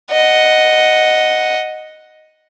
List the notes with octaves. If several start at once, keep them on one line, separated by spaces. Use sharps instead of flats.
D#5 F#5